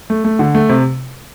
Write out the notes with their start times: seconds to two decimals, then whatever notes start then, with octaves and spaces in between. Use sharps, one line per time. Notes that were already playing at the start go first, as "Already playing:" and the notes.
0.10 A3
0.24 A3
0.39 D3
0.55 A3
0.69 C3